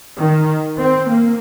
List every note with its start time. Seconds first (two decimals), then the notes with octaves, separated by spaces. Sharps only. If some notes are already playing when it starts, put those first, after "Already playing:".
0.18 D#3
0.79 C4
1.09 A#3